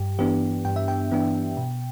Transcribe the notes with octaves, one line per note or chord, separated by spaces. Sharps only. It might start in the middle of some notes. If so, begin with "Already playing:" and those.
Already playing: G2 G4
E3 B3 D4 G4
G2 G5
E5
G5
E3 B3 D4
B2